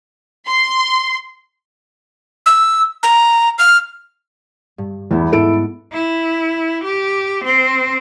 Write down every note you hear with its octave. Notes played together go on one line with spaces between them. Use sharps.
C6
E6
A#5
F6
G2
E2 B3 D4 E4
G#2 B3 E4 A4 C#7 D7
E4
G4
C4